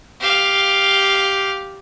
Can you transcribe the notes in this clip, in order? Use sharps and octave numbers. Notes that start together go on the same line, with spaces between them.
G4 F5